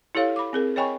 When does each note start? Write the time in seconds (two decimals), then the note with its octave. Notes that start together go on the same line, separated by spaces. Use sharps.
0.15 E4 G4 A4 C#5 F5
0.36 B5 D6
0.53 C4 G#4 A#4
0.76 C#5 D#5 G5 G#5 B5 C#6